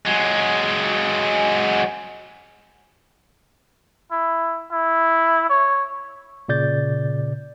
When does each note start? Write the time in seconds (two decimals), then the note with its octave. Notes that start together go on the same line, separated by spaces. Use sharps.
0.05 F#3 G#3
4.11 E4
4.72 E4
5.50 C#5
6.49 A#2 C#3 D5 G6 A6